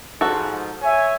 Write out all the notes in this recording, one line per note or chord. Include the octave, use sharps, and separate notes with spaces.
G#2 F3 F#4 A4
C#5 E5 G#5